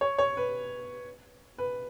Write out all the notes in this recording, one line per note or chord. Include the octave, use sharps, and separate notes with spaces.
C#5
C#5
B4
B4